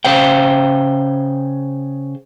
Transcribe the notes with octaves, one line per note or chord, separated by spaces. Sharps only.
C#3 C5 F5 G5